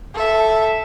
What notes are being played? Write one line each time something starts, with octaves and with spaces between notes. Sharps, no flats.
A4 E5